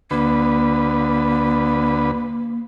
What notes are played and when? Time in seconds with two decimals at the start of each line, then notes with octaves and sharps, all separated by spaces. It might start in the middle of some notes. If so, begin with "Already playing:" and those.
0.11 D2 A#3 B4